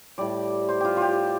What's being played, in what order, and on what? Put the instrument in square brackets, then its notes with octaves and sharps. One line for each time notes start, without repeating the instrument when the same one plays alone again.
[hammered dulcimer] A2 G3 D5
C5
F4 G4
F4
G4